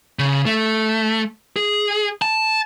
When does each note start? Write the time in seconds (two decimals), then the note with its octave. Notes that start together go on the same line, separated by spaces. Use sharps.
0.19 C#3
0.46 A3
1.56 G#4
2.22 A5